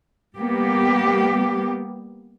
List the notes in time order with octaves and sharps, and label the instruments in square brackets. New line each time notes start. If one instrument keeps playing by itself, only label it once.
[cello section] G3 A#3 B3 G4